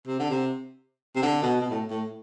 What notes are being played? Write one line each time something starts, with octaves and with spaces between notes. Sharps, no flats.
C3
D3
C3
C3
D3
B2
B2
A2
A2